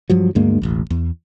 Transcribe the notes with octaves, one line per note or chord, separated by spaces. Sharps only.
G2 F3 F#3
D2 G2 G#3 A#3
E1 A1 D#2
E2